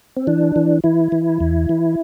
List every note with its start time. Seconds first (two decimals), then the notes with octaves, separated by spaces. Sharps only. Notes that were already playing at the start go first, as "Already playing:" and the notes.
0.17 C4
0.27 E3 D4
0.56 E3
0.84 E3 E4
1.12 E3
1.40 E2
1.69 E3